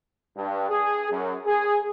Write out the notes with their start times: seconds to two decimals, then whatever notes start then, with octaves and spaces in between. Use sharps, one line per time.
0.36 G2
0.69 G#4
1.11 F#2
1.46 G#4